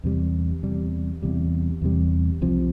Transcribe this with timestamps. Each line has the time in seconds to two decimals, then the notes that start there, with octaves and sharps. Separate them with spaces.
0.04 E2 C3 G3
0.63 E2 C3 G3
1.22 E2 C3 G3
1.82 E2 C3 G3
2.41 C2 C3 F3